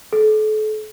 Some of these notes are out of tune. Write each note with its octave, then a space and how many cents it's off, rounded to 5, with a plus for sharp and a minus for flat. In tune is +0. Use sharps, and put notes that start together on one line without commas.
A4 -40